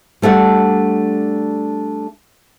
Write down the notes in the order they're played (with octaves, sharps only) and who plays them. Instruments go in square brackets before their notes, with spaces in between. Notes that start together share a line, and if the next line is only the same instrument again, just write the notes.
[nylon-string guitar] G3 A3 D4 F#5